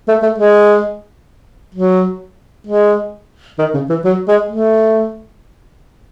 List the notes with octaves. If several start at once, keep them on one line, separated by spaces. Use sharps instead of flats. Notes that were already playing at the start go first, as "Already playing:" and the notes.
A3
A3
G#3
F#3
G#3
D#3
C#3
E3
F#3
G#3
A3